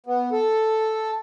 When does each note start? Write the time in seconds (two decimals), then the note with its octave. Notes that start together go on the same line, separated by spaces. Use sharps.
0.06 B3
0.32 A4